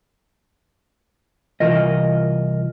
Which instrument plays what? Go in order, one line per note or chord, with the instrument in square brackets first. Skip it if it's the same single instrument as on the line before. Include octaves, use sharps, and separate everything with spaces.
[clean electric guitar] C2 E3 F4 A#4 D#5